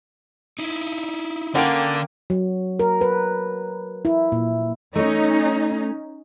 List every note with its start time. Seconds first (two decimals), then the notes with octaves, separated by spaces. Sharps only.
0.59 D#4 E4
1.55 D3 A#3 C#4 F#5 G5
2.30 F#3
2.80 A#4
3.01 B4
4.05 E4
4.32 A#2
4.96 A3 C#4 D#4 C#5